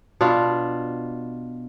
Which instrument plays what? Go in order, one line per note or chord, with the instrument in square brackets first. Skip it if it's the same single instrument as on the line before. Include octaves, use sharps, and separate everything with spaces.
[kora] B2 D4 F4